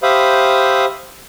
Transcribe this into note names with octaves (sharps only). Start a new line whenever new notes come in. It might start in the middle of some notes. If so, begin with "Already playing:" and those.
G4 C5 E5 F5 B5 D#6